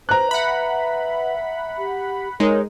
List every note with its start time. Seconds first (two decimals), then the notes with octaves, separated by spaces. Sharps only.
0.09 B4 C5 A#5 F#6
0.31 E5 F#5 B5
1.78 G4
2.40 G#3 D#4 A#4 C#5